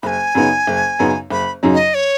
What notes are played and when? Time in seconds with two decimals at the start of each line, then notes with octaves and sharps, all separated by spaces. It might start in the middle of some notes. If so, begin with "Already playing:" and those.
0.03 F#1 G#5 B5
0.35 F#2 C#3 B3 D#4
0.67 F#1
0.99 F#2 C#3 B3 D#4
1.31 F#1 B5
1.63 F#2 C#3 F#3 D#4
1.74 D#5
1.94 C#5